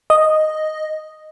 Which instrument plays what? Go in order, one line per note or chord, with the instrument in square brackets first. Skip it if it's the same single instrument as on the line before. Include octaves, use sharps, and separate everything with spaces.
[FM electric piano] D#5